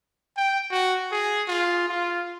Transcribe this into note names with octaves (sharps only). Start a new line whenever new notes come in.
G5
F#4
G#4
F4
F4